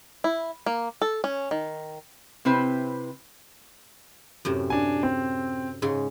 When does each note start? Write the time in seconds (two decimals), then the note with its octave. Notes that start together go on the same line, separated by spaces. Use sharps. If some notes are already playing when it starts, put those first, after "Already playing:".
0.24 E4
0.66 A#3
1.02 A4
1.24 C#4
1.51 D#3
2.45 C3 C4 E4 B4 C5
4.45 F#2 A2 C3
4.70 D4 G#5
5.03 C4
5.82 G#2 C#3 C6